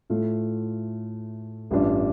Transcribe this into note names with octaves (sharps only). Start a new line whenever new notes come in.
A2 A3 F4
A1 G2 G3 D4 F4